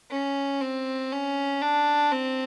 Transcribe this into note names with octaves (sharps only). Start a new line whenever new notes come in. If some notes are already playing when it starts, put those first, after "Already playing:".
C#4
C4
C#4
D4
C4